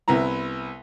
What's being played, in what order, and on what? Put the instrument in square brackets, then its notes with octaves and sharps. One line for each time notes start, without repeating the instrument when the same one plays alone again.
[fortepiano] C2 B3 E4 A#5